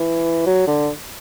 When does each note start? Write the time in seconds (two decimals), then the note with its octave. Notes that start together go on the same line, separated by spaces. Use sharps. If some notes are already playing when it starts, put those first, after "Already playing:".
Already playing: E3
0.46 F#3
0.67 D3